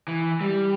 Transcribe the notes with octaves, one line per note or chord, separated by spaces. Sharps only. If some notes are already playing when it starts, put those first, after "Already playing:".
E3
G3